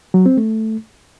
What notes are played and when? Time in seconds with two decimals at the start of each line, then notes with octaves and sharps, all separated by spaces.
0.14 F#3
0.26 C4
0.37 A3